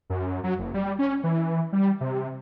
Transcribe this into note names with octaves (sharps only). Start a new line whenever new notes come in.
F#2
F#3
F#1
G3
C#4
E3
G3
C3